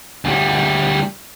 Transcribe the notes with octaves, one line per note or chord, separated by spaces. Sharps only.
D2 G3